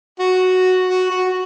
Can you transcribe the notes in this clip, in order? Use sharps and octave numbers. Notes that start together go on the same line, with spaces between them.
F#4
F#4
F#4